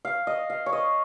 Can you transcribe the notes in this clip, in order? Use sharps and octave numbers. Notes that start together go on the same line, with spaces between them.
F5
D#5
F5
C#5
D#5